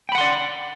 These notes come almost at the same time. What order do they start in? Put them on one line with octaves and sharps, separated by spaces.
G5 B5 F#5 C6 D5